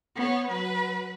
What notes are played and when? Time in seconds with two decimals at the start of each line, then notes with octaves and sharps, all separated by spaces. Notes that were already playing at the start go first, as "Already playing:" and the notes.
0.16 B3 C#5
0.48 F#3 B4